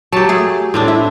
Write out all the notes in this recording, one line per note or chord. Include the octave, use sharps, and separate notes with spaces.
F#3 G4 A5
A3 G#4
A2 C4 D4
E4